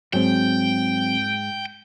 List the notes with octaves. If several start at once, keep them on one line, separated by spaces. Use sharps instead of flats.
G#2 F#3 C4 G5